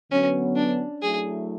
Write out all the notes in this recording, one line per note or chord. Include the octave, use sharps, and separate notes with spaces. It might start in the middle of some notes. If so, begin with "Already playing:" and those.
D3 F#3 B3 C#4 F#4
D4
F#3 A3 E4 G#4